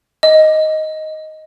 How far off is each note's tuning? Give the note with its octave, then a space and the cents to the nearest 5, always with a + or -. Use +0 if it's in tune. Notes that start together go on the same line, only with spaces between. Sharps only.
D#5 +5